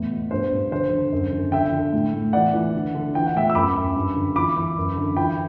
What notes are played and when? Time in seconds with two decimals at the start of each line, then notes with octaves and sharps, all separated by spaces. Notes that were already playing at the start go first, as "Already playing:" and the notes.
Already playing: E2 A2
0.11 B2
0.31 G2 C5
0.52 G2
0.72 D3 C5
0.91 D3
1.12 F#2
1.32 D3
1.52 D3 E5 G5
1.72 D3
1.93 A2
2.14 A2
2.33 E3 D5 F#5
2.53 E3
2.74 D3
2.95 D3
3.15 E3 G5
3.26 F#5
3.35 A2 E5 G5
3.50 E6
3.55 F#2 B5 D6
3.76 F#2
3.96 G2
4.16 D3
4.36 E3 B5 D6
4.56 E3
4.77 F#2
4.96 D3
5.17 E3 G5 B5